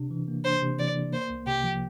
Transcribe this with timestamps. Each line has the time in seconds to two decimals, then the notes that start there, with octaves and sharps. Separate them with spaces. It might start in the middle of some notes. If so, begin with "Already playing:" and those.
Already playing: C3 D4
0.11 E3
0.28 A#3
0.45 D4 C5
0.62 C3
0.79 E3 D5
0.96 A#3
1.13 A#3 C5
1.30 C2
1.47 C3 G4
1.64 F3